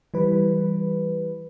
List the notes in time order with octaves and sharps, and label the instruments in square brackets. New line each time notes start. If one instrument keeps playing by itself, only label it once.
[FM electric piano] E3 G3 B4